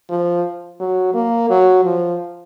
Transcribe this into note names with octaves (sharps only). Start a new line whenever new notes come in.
F3
F#3
A#3
F#3
F3